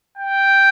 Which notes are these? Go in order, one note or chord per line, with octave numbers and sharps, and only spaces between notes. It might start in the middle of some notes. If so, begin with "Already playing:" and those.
G5